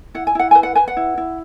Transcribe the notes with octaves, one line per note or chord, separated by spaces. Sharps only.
E4 F#5
G#5
E4 F#5
B4 G#5
F#5
B4 G#5
F#5
E4
E4